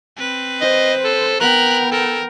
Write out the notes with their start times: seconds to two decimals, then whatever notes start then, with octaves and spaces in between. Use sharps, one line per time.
0.18 C4 B4
0.61 C5 D#5
1.04 A4
1.40 B3 A#4 G5 B5 F#6
1.91 A4 A#4